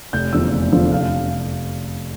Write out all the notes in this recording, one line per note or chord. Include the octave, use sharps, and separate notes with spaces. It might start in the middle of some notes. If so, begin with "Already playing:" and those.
F1 G6
E2 D3 F3 E6
F1
E2 D3 F3
F1 F5
F5